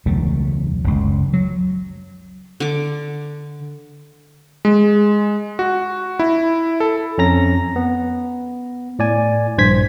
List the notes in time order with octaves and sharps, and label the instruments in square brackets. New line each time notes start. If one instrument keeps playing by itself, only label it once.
[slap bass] E1 C#2 F#3 A3
F#1 C#2
F#3
[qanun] D3 D6
[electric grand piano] G#3
F#4
E4
A4
[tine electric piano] F2 C#4 A#5 A#6
B3
A2 D5 G#5
A#1 G2 C5 G#6 B6